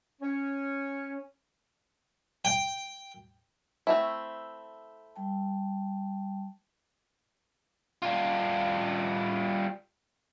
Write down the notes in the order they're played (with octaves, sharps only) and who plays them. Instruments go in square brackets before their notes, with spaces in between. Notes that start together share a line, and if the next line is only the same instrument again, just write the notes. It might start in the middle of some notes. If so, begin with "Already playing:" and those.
[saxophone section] C#4
[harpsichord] G5
[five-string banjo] A3 C4 E4
[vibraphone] G3 G5 A5
[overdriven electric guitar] G3 F4